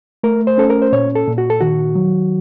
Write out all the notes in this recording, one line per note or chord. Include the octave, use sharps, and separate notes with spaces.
A3 A#4
C5
C#4 A4
A#4
C5
A#2 C#5
A4
A#2
F#4
A4
D#3 F#4
F#3